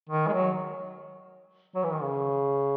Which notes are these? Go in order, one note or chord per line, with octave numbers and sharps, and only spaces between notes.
D#3
G#3
F#3
F#3
E3
D#3
C#3